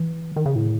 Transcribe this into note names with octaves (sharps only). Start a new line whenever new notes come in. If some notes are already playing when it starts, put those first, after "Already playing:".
Already playing: E3
D#3
C#3
A2